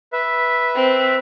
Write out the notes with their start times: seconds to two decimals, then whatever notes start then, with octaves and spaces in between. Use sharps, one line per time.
0.13 B4 E5
0.75 C4